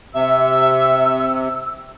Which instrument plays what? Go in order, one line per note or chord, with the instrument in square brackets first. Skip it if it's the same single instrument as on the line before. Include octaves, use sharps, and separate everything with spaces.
[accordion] C3 [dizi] E5 [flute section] E6